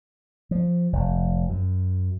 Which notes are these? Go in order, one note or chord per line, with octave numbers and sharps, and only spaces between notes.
F3
F1
F#2